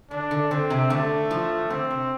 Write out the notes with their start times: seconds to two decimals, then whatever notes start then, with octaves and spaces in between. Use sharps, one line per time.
0.11 D3 D4
0.31 D3
0.51 D3 C4
0.70 C3
0.90 D3 A3
1.31 F3
1.70 D3 C4
1.91 C3